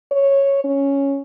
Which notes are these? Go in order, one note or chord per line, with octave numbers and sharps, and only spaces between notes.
C#5
C#4